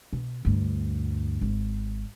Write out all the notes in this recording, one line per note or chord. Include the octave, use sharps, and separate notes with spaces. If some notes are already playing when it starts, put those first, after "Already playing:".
B2
D2 G2
G#1